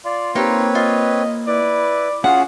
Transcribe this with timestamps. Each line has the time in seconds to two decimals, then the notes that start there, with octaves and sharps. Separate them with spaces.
0.05 F4 D5
0.35 A#3 C4 D#4 G4 B4 C#5
0.75 F4 D#5
1.47 E4 B4 D5
2.24 C#4 F4 F#4 G#4 F5 F#5